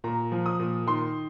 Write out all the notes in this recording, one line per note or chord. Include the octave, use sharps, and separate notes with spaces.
A#2 A#5
F3
D#6
A#2
D#3 C6